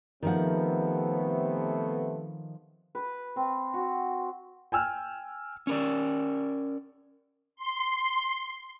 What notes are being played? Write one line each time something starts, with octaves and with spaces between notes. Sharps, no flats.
C3 D#3 F3 A3 B3 F#5
B4
C4
F#4
G5 G#5 E6 F6
C#4 A#4 D5
C6